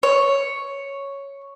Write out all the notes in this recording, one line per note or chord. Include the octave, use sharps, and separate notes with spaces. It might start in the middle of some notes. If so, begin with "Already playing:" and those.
C#5